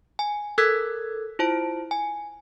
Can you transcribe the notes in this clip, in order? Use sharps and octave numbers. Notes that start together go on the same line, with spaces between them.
G#5
A4 A#4 E6 F#6 G#6 B6
E4 F4 C5 A5 D7
G#5